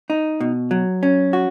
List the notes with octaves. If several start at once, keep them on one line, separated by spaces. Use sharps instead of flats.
D#4
B2
F#3
C#4
F#4